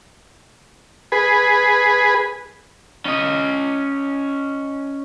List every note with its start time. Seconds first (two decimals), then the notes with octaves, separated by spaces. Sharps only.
1.12 G#4 B4
3.05 C#4 D#5